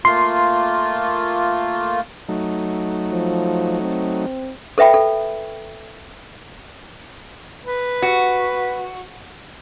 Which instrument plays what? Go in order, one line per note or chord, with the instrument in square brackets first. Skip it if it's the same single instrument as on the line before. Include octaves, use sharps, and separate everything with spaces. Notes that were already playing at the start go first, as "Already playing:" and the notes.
[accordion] A3 A#3 F4 [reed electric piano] C6
[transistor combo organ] F#3 A3 D#4
[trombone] F3
C4
[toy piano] A4 B4 E5 G5 B5
A4
[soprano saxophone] B4
[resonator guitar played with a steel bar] F#4